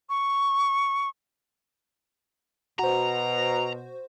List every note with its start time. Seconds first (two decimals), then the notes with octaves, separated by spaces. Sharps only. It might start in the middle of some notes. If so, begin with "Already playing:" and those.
0.10 C#6
2.79 B2 F#4 C5 A#5